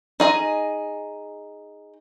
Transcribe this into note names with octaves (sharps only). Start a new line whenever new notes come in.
D#4 G#4 D#5